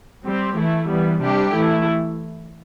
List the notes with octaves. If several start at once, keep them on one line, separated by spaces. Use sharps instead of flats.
G3 C4 G4
E3 A3 E4
E3 G3 B3
C3 G3 D4 G4
E3 A3 E4